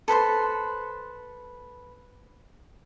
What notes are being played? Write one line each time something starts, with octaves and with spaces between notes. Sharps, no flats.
A4 B4 C5 C6